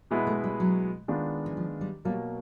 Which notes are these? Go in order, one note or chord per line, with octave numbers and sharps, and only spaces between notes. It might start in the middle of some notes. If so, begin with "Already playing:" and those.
B2 G#3 B3 E4
A3
G3
F#3
D#3 G#3 B3 D4 F4
E3
F3
G3
B2 F#3 G3 A#3